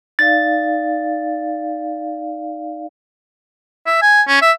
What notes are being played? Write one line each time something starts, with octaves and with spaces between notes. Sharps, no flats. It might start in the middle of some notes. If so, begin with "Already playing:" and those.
D#4 D5 F5 A6
E5
G#5
C#4
E5